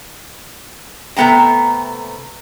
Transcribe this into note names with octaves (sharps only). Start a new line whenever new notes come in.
C3 A3 B3 G5 A#5